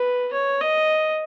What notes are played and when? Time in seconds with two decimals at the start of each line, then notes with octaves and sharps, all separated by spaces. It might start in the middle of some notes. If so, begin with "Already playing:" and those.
Already playing: B4
0.33 C#5
0.60 D#5